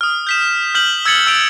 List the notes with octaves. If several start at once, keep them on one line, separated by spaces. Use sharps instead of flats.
D#6 F6
G6 B6 E7
F6 G6 B6 F#7
E6 G#6 A6 C#7 F#7 G7
E6 F6 G6 D7 F7